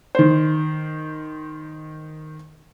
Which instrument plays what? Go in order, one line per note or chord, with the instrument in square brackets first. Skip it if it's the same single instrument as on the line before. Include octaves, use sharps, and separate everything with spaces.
[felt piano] D#3 C5